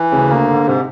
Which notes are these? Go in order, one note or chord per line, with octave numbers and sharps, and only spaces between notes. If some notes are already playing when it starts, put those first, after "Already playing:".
Already playing: E3
D2 C#3
D3 A#3
G#2 D3
G#2 C3